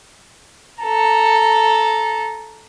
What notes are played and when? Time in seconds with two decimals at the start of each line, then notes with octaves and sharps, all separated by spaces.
0.83 A4 A#5